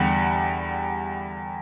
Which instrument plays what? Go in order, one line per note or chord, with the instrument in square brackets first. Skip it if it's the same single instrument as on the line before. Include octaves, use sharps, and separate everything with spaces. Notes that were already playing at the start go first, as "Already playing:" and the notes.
Already playing: [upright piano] E2 D3 G3 F#5